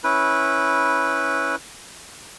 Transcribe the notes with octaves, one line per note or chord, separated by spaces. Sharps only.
C#4 E4 B4